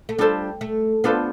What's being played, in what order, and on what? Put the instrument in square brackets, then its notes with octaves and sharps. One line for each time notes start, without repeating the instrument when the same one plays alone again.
[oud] A3
[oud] G3 [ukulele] D4 F4 A4 C5
[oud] A3
[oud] B3 [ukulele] D4 F4 A4 C5